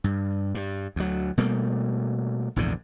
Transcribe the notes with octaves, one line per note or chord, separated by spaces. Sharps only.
G2
G2
D2 F#3
B2 G3 A3 A#3
A#1 E2 G#2 D3